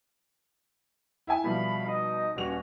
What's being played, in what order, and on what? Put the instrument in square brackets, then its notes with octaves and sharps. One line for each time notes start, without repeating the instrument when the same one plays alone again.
[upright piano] E4 E5 G#5
[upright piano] B2 F3 G3 [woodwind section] A3 F5 B5
[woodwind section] D#4 D#5
[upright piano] D#1 F7 [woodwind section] G2 C#4 F#4